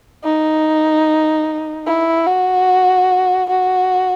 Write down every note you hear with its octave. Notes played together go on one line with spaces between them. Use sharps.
D#4
E4
F#4
F#4